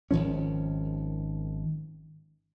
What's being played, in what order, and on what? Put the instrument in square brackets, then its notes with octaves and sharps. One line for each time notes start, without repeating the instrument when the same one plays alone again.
[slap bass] G#1 D#3 F3 C#4